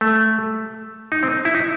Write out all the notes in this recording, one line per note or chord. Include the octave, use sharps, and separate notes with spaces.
A3
D#4
C4
E4
D#4